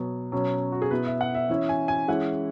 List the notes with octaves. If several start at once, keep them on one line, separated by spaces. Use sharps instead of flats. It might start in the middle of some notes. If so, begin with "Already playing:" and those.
Already playing: B2 F#3 B3
B2 F#3 C#4
F#4
G#4
B2 B3 E4 B4
E5
F#5
E5
E3 C#4 E4 E5
G#5
G#5
E3 G#3 C#4 E4 F#5